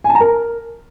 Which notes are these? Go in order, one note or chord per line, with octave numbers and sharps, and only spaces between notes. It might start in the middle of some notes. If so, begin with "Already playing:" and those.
G#5
A5
A#5
A#4